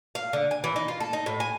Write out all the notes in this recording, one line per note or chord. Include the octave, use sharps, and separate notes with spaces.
F5
D3
G#5
E3
D#4
F4
A4
D#4
A2
G#5